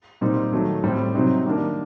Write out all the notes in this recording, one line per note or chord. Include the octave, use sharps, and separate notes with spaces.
A#2 G3 C4 D#4
D#3 F#3 A3
A2 G3 C4
C3 F#3 C4 D#4
D#3 G3 A#3 D4